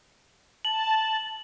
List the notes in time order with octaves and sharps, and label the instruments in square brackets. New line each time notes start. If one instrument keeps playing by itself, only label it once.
[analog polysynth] A5 [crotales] F#7